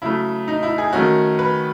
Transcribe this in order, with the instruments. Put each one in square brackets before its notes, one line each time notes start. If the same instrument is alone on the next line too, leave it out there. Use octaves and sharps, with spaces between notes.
[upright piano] C#3 F#3 A3 E4
D#4
E4
G#4
D#3 A3 C#4 F#4
B4